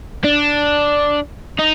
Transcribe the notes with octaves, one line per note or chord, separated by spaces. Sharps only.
D4
D#4